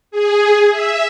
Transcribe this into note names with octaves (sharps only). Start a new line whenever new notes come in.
G#4
E5